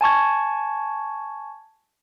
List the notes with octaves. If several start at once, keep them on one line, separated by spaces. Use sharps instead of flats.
G#5 A5 C#6 G#6